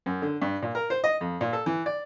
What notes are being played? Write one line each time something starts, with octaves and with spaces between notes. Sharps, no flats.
F#2
D3
G2
A#2
A#4
C5
D#5
F2
A#2
A4
E3
D5